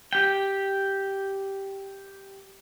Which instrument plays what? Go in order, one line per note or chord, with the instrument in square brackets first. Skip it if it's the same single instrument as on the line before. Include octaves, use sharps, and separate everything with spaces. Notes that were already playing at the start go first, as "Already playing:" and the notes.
[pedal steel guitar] G4 G5